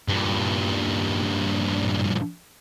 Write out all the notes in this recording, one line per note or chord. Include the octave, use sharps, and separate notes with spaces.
G2 A#2